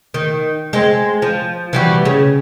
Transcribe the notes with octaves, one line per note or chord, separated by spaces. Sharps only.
D#3
G#3 C4
F3
E3 G3 F#4
C#3